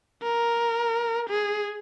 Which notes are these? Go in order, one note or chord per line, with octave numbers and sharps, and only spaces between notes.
A#4
G#4